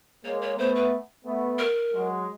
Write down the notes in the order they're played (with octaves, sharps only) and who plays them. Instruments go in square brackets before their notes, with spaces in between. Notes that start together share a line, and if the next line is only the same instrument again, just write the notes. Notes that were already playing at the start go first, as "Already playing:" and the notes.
[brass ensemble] G#3 A#3 [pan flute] C#5
[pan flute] C#5
[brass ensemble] A3 B3 [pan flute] C5
[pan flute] B4
[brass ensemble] A3 B3
[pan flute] A#4
[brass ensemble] F#3 G#3